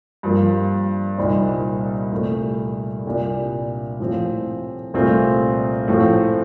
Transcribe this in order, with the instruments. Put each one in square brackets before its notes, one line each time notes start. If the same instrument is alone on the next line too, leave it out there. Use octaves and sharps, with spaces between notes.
[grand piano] G2 F3 A#3
C2 A#2 G3 C4 D#4
C2 A#2 A3
C2 A#2 G3 D4
A2 F3 C4
C2 A#2 A3 C4 F4
A2 F3 A3 C4